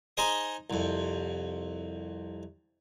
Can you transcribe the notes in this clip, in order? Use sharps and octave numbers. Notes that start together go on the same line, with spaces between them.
D#4 G#4 C5 D#5 C6 D#6
C2 F2